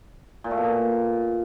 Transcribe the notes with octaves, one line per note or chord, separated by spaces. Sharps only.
A#2
A3
B2
A#2